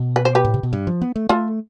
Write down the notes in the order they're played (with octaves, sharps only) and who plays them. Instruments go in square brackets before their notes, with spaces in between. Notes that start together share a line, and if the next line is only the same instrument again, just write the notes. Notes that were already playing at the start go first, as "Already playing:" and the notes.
Already playing: [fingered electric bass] B2
[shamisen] B4
C5
G4 B4
[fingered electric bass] A2
C3
B2
G2
F3
B3
A3
[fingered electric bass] A3 [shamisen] F4 A4